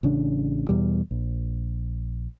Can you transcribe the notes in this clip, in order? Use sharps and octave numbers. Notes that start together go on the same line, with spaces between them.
A1 C#3 D4
E2 B2 G3
A#1